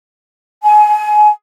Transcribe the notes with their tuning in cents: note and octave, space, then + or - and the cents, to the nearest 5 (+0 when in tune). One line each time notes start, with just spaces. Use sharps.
G#5 +25